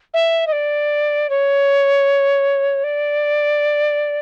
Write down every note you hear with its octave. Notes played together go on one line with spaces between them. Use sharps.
E5
D#5
D5
C#5
D5